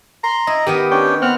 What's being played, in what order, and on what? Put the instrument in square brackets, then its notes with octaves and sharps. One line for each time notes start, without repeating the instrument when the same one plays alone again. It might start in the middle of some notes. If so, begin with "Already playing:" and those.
[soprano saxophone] A#5 [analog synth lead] C6
[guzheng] E4 [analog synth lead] D#5
[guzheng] D#3 B3 D#5 [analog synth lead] G4
[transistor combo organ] C#4 D4 [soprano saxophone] G5
[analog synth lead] B3 [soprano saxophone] C4 [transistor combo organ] F#5 F6